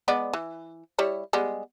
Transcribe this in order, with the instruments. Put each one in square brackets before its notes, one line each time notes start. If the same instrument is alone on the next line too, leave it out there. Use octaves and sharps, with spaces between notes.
[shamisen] G#3 B3 D5
E3
G3 E4 C#5
G3 G#3 B3